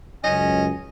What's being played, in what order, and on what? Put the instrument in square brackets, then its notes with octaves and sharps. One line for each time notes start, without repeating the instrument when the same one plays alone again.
[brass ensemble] C#2 F#2 [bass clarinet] C#4 [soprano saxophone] D#5